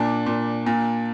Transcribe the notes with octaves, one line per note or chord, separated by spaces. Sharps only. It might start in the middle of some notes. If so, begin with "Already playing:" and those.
Already playing: A#2 D4
A#2
A#2